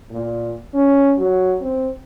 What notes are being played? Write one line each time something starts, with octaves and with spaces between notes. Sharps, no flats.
A#2
C#4
F#3
C4